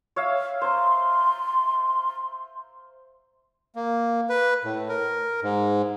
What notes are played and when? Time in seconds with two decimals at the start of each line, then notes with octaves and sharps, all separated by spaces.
0.16 C#5 E5 F5
0.62 C5 A#5 C6
3.75 A#3
4.29 B4
4.64 A2
4.89 A#4
5.42 G#2